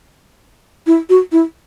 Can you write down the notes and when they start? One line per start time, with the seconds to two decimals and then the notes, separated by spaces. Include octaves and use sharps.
0.87 E4
1.09 F#4
1.32 E4